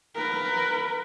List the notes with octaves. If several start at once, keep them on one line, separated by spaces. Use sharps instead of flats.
A#4 B4